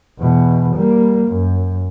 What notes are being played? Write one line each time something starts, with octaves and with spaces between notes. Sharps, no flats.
E2 B2
G3 A#3
F#2